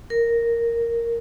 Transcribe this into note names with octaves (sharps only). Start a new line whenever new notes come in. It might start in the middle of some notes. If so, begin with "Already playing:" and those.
A#4